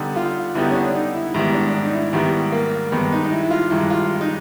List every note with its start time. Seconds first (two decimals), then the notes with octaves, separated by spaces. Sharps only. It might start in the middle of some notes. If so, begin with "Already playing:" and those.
Already playing: D3 G3 B3 D#4 G4
0.16 F4
0.55 D3 G3 B3 D#4 E4 G4
0.71 C#4
0.75 D4
0.95 D#4
1.14 E4
1.34 G#2 D#3 G3 B3 E4
1.54 D4
1.73 D4
1.85 D#4
1.93 E4
2.13 G#2 D#3 G3 B3 E4
2.52 A#3
2.92 G2 D#3 G#3 B3
3.12 D#4
3.24 D#4
3.31 E4
3.43 E4
3.50 F4
3.70 G2 D#3 G#3 E4
3.90 F4
4.21 D#4